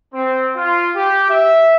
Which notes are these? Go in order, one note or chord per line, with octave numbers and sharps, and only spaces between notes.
C4
F4
G4
E5